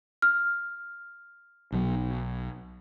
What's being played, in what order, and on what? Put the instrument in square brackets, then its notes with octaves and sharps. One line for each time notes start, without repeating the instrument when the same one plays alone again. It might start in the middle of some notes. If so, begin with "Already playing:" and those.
[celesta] F6
[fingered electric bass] B1 F#3